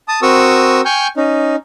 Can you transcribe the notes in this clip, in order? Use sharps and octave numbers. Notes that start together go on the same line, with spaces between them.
A5 D#6
C4 F#4 A#4 C#6 D#6 E6
G5 G#5 C#6 F6 G6
C#4 D#4